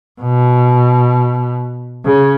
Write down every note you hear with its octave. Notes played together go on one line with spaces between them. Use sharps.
B2
C#3